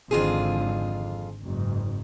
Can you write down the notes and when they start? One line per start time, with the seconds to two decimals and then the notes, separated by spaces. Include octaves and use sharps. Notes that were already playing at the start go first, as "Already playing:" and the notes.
0.11 G#1 F2 D3 F4 G#4
1.43 F#1 G#2